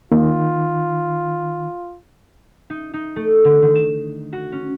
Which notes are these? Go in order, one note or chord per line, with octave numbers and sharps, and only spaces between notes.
D#3 A#3 F4
D#4
D#4
A3
D3
D#3
E7
F#4
C#4